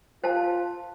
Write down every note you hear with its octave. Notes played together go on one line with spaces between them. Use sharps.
F4 C5 F5 A5